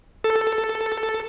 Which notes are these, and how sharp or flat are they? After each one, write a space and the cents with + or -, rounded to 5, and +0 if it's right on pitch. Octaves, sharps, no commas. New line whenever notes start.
A4 +5